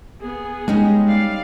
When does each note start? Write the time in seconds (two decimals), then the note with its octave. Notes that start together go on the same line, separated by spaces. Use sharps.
0.21 B3 G#4
0.68 G3 G#3 C#4 D#4
1.07 D5 F5